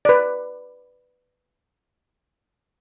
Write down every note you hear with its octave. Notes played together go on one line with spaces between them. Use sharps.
B4 D5